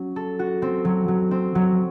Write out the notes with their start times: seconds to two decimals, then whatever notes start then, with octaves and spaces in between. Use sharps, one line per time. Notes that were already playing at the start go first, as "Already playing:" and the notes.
Already playing: F#3 C#4
0.16 A4
0.39 F#4
0.62 C4
0.85 F#3
1.08 F#3
1.31 C4
1.55 F#3